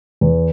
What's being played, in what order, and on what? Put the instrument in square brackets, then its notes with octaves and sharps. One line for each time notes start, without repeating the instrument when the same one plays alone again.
[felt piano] E2